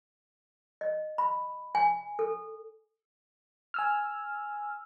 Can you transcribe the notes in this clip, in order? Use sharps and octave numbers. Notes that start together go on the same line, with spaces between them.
D#5
B5
G#5
A4
G#5 E6 F6